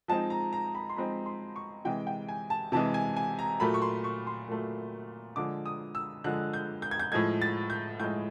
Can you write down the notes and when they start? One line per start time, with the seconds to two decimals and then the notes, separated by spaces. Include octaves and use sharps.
0.08 F3 G#3 C4 D#4 A5
0.30 A#5
0.53 A#5
0.75 B5
0.89 C6
0.97 F3 G#3 C4 D#4 B5
1.26 C6
1.56 C#6
1.85 C3 E3 G#3 G5
2.07 G5
2.28 G#5
2.50 A5
2.72 C3 E3 G#3 A5
2.94 G#5
3.16 G#5
3.39 A#5
3.60 A#2 F#3 A3 B5
3.74 C#6
3.82 C6
4.04 C#6
4.27 C6
4.48 A#2 F#3 A3
5.36 D3 F3 G#3 D6
5.66 D#6
5.95 E6
6.24 D3 F3 G#3 F#6
6.53 G6
6.82 G6
6.91 G#6
6.99 G6
7.12 A2 F3 G#3 G#6
7.42 A6
7.70 G6
8.00 A2 F3 G#3 G6